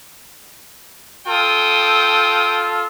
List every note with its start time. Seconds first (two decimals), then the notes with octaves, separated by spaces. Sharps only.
1.27 F4 A4 G5 D#6